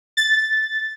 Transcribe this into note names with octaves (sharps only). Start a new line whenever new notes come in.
A6